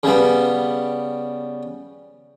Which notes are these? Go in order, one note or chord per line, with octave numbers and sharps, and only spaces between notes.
C#3 G3 B3